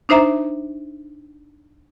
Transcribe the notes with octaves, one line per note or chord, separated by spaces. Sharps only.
D4 D#4 C5 E5 A#5